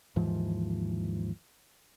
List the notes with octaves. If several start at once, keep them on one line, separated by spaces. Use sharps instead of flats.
D#2 G#2 E3 F3